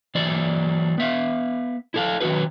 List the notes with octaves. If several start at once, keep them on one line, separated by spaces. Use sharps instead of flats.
E3 F#3 C5 D5
B3 E5 F5
E4 A4 F5
D#3 F#3 F#4 G#4 B4